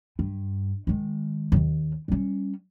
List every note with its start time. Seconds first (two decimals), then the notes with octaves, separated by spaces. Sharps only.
0.19 G2
0.87 D#3 G#3
1.52 D1 D#2
2.08 G3 C#4